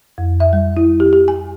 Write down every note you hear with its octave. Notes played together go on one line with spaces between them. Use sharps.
F2
E5
G3
E4
G4
G4
G#5